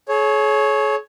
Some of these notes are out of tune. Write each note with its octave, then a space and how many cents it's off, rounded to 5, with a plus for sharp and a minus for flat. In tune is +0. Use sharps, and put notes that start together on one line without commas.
G#4 +40 C#5 +0